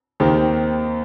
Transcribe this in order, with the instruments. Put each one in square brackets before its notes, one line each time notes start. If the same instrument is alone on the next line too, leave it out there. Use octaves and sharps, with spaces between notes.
[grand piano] D#2 D#3 C4 G4